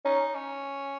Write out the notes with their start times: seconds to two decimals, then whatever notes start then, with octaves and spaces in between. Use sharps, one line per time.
0.05 C#4 D#4
0.35 C#4